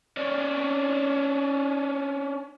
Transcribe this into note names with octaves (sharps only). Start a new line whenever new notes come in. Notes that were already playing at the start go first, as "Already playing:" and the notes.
C#4 D4